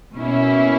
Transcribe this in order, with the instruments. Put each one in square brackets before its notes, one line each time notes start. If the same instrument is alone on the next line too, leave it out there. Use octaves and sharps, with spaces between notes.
[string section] B2 A#3 C#4 E4